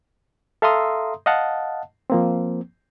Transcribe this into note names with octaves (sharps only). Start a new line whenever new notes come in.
A4 E5 F5 A#5 C6 D#6
D#5 F5 F#5 A5
F3 A#3 C4